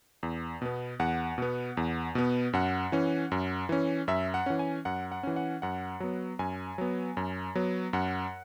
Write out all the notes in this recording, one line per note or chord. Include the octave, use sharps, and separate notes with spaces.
E2
B2 B3
E2 F#5
B2 B3
E2
B2 B3
F#2 F#5
E3 C#4
F#2
E3 C#4
F#2 E5
F#5
E3 C#4
G#5
F#2 F#5
F#5
E3 C#4
F#5
F#2 F#5
F#3 B3
F#2 G#5
F#3 B3
F#2
F#3 B3
F#2 F#5